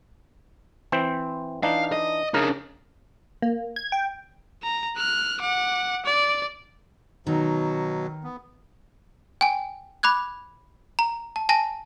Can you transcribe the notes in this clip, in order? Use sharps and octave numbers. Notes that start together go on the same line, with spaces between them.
E3 C4 C5
E3 D4 D#4 F5
D#5
C#3 D4 D#4 A#4
A#3
G#6
G5
A#5
F6 F#6
F#5 D6
D5
B2 D#3 F#3
B3
G5 G#5
B5 D6 F#6 G#6
A#5
A5
G#5 A5 A#6